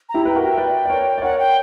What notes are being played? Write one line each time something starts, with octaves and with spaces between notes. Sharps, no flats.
A#5
E4 G4
B4 G5
F#4 A#4
G5
E5
B4 D5
D5
A#4 C#5
D5
A#4 C#5 F#5
G5